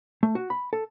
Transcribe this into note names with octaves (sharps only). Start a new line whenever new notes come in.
A3
F#4
B5
A4